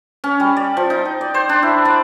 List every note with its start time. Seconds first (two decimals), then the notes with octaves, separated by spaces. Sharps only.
0.24 C#4
0.40 G3
0.57 D5
0.77 F3
0.90 D#4
1.05 G5
1.21 D5
1.34 C5
1.49 D4
1.63 E4
1.85 D5